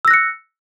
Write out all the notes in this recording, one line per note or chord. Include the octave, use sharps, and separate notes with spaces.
E6 F#6 A#6 C#7